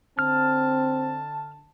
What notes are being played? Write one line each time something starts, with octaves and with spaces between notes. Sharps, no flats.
D3 C4 A5 F6